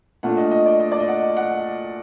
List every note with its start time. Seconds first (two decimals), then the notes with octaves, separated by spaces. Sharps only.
0.23 A#2 A3 D4 F#5
0.37 D#5
0.51 D#5
0.66 D5
0.80 D#5
0.92 D5
1.00 D#5
1.08 F#5
1.37 F#5